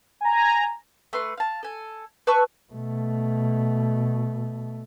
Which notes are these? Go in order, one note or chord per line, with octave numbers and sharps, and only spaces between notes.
G#5 A#5
A3 B4 C6
F5 A5
A4 G#5
B4 A5 C#6 E6
B2 A3